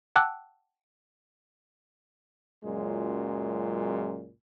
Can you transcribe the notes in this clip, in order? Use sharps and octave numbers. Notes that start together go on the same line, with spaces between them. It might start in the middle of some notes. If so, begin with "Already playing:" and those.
F#5 G5 A5 D6 E6 F#6
C#2 F#2 A#2 F#3 G#3